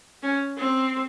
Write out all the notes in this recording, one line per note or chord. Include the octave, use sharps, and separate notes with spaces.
C#4
C4